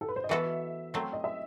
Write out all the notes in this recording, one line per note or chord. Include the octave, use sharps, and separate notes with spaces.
A4
B4
C5
D#5
E3 B3 F#4 A4 E5
F#3 A3 C4
D#5
E5